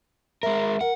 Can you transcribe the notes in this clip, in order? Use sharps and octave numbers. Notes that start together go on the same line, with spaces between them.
G#3 A#4 E5
A#4 F#5